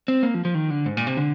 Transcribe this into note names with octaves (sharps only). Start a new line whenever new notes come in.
C4
A#3
F3
F3
D#3
D3
G#2
A#2
C3
D3